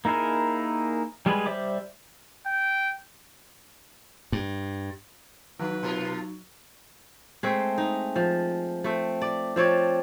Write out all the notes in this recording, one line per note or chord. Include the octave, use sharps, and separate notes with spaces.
A#3 D#4 E4 G#4 A#4
G3 G#3 G4 G#4 B4
G3 C5 D5 E5 D6
G5
G2
D#3 F#3 D#4 B4
B2 F4 A#4
G#3 A3 C4
D#4
F3
A3 C4
D5
F3 C4 C#5 D5